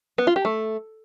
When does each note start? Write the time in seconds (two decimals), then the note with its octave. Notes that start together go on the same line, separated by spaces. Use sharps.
0.18 B3
0.27 F4
0.36 G4
0.45 A3